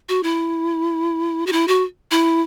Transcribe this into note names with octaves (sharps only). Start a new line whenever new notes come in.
F#4
E4
F#4
E4
F#4
E4